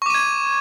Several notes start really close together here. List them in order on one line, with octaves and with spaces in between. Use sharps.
C#6 D6 D#7 G#6